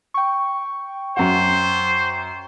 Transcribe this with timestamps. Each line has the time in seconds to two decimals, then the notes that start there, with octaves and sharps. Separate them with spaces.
0.14 G5 C#6
1.17 F#2 C5 F#5